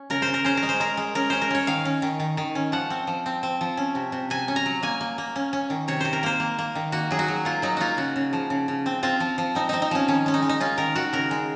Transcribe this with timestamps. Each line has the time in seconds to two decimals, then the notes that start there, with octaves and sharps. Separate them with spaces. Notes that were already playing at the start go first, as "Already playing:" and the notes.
Already playing: C#4
0.10 C#3 A#4
0.22 C5
0.27 C#3
0.34 A#4
0.45 C#4 C5
0.57 A#4
0.63 G#3
0.69 C5
0.80 G#3 A#4
0.97 G#3
1.15 C#4 A#4
1.30 C#4 C5
1.42 A#4
1.51 C#4 C#5
1.67 D#3 F5
1.85 C#4
2.02 D#3
2.20 D#3
2.37 D#3
2.55 C#4
2.72 F3 F#5
2.90 C4
3.07 F3
3.26 C4
3.43 C4
3.61 F3
3.77 C#4
3.95 C3
4.12 C3
4.30 C3 G#5
4.48 C#4
4.56 A#5
4.66 F#3
4.83 A#3 G#5
5.01 A#3
5.18 A#3
5.36 C#4
5.53 C#4
5.70 D#3
5.88 C3 C#5
6.00 C3 C5
6.13 A#4
6.23 A#3 C5
6.40 A#3
6.58 A#3
6.75 D#3
6.92 A#3 F#4
7.11 F#3 G#4
7.19 F#4
7.28 F#3
7.45 A#3 F4
7.62 F#3 D#4
7.77 A#3 F4 F#4
7.97 C#3 F#4
8.16 C#3
8.33 F3
8.50 C#3
8.68 C#3
8.86 C4
9.03 C4 F4
9.20 F3
9.38 F3
9.55 C4 D#4
9.69 C4 D#4
9.82 D#4
9.91 F3 C#4
10.08 D#3 C#4
10.26 G#3 C#4
10.34 D#4
10.43 G#3
10.49 D#4
10.60 C#4 F4
10.78 D#3 A#4
10.95 D#3 F#4
11.13 C#3 A#4
11.31 G#3